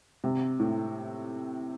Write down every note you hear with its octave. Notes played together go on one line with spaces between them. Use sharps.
C3
A2